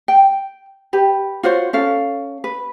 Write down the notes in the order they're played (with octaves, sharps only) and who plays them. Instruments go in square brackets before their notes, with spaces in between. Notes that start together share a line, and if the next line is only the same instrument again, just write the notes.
[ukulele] G5
G4 B4
F4 F#4 C5 C#5
C#4 A4 F5
B4